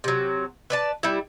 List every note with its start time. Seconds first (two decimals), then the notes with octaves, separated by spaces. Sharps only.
0.04 C3 F#3
0.70 B4 D5 A5
1.03 G3 E4